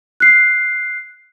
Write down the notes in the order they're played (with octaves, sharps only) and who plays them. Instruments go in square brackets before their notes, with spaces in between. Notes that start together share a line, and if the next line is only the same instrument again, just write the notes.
[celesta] F#6 C7